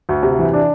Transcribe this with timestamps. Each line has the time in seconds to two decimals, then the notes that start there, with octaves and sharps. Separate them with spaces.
0.09 D2
0.23 C3
0.39 E3
0.53 D4